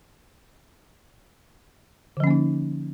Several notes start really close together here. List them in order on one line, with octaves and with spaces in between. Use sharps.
D3 F3 C#4 A#3 D#4